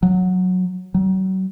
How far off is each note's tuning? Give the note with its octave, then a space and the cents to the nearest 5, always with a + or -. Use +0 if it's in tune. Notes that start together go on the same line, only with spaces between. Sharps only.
F#3 -10
F#3 +35